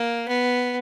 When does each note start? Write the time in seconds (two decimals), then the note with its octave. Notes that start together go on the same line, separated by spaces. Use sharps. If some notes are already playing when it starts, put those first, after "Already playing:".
Already playing: A#3
0.28 B3